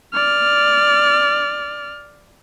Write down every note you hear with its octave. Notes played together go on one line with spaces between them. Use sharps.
D5 F6